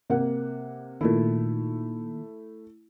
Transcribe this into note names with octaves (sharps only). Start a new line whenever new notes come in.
C3 A#3 F#5
A#2 D#3 A3 E4